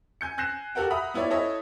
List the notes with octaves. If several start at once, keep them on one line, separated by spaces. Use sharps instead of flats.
G#5 G6 C#7
G#5 F#6 G6 A#6 C7 E7
F#4 G4 A4 A#4 F#5 G5
E5 F#5 A#5 B5 D#6
B3 E4 F4 C#5 D5
E4 A4 C#5 D#5 E5